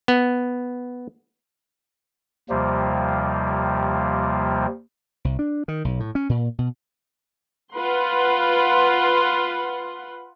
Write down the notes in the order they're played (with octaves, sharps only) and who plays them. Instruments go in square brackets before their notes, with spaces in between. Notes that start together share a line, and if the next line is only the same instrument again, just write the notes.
[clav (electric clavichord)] B3
[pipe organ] D#2 C3 F3 G3 A#3
[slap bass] C2
D4
D#3
B1
A2
C#4
A#2
B2
[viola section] F4 B4 F#5 C6